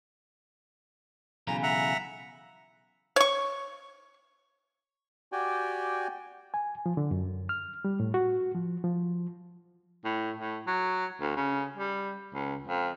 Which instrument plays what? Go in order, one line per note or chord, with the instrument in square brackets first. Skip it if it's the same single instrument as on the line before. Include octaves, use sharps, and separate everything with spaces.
[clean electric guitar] B1 C#3 E3 [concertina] A#5
[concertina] E5 F#5 A#5
[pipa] C#5 C#6
[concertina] F#4 G4 D5 G5 G#5
[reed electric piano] G#5
F3
D3
F#2
F6
G3
A2
F#4
F3
F3
[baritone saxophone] A2
A2
F#3
D2
C#3
G3
C#2
F2